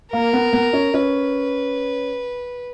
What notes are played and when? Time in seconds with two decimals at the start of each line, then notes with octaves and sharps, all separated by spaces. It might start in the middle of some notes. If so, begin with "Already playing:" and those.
0.12 A#3 A#4
0.33 B3
0.53 B3
0.73 C#4
0.94 C#4 B4